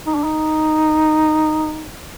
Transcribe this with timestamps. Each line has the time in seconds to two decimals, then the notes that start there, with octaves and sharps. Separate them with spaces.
0.07 D#4
0.15 D4
0.24 D#4